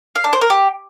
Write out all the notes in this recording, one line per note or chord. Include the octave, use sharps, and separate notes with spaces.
F5
D4
C5
A#4
G4